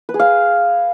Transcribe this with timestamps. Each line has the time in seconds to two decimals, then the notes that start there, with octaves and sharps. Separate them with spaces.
0.09 B4
0.14 G#4
0.20 F5